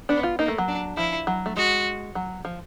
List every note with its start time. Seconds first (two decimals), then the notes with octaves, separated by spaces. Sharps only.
0.09 B3 D4
0.23 F4
0.39 A#3 D#4
0.48 A3
0.58 F#3
0.68 D4
0.97 F3 E4
1.27 F#3
1.46 A3
1.56 G#3 F#4
2.15 F#3
2.45 F3